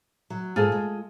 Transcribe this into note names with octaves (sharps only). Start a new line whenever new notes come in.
F#3
G#2 F4 G#4 A4
G#3